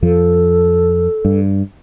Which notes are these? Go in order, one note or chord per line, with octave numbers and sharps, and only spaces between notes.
F2 F3 A4
G2